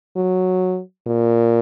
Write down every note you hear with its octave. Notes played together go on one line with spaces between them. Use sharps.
F#3
A#2